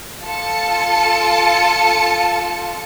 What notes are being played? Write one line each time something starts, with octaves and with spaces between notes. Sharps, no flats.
F4 A4 A5 C#7